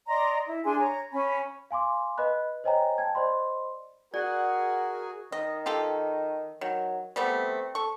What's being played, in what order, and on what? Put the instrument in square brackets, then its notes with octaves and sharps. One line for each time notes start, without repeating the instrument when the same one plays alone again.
[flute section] D5 D#5 A#5 C6
E4
D4 G#4 G#5 C6
C#5 A#5
C#4 G#5 B5
[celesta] F5 G#5 C6 D6
B4 D#5 B5 F#6
C5 C#5 D#5 G5 G#5 A#5
G5 A5 G#6
C5 D5 D#5 B5 C6
[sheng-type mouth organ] F#4 G#4 G#5 [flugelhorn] A#4 [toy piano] D5 [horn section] F#5
[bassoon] D#3 [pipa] D#5
[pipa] F4 G4 A4
[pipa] D#3 [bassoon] F#3
[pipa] G3 A3 B3 [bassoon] C4
[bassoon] A4 [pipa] C#6